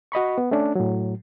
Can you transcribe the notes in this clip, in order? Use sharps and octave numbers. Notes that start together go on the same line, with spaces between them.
F#4 D#5 B5 C#6
B3
A3 C#4 D4
A2 F#3